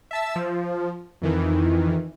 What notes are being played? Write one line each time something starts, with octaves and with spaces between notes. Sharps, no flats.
E5 A5 E6
F3
F2 D#3 E3